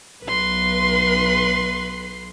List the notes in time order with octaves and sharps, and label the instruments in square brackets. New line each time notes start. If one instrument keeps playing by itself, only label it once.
[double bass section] B1 [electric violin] B4 C6